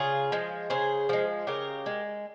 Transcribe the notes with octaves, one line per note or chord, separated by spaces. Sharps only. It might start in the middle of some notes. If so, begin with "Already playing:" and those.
Already playing: C#3 F4 G#4
F3 G#3
C#3 G#4 C5
F3 G#3
C#3 G4 A#4
G#3